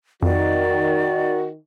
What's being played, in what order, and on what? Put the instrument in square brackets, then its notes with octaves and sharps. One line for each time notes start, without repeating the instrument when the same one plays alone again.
[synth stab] F2 [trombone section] D#3 [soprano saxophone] F#4 [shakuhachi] D5